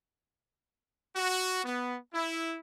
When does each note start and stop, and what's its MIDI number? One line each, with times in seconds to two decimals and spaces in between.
1.16 1.63 66
1.64 1.96 59
2.13 2.57 64